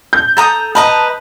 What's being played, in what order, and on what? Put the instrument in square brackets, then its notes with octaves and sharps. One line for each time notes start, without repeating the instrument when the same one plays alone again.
[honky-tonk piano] G6
[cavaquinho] A4 A#5 D#6
[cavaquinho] B4 D#5 A#5 [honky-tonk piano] A5